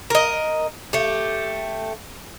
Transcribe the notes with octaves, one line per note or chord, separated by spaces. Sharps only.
A#4 D#5
A3 G4